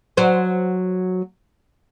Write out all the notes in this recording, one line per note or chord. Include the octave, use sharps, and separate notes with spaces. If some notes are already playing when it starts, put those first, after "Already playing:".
F#3 C5